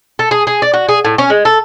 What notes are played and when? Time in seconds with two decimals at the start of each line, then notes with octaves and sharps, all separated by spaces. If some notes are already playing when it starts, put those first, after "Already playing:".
0.19 A4
0.31 G#4
0.47 G#4
0.62 D5
0.74 F#4
0.89 G#4
1.05 A2
1.18 C#4
1.30 G#3
1.45 A4